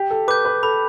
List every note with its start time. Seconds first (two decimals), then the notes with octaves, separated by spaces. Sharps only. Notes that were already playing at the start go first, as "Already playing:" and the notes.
Already playing: G4
0.11 A4
0.28 B4 D6 G6
0.45 B4
0.63 A4 B5